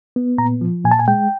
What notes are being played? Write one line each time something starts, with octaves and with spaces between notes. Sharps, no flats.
B3
A#2 A#5
F3
A#2 G#5
A5
G#5
G#3 G5